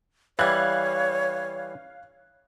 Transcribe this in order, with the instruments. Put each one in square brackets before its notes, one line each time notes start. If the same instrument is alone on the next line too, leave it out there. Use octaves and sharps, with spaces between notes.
[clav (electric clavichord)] E3 G3 [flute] C#5 [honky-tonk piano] F5 F#6 G#6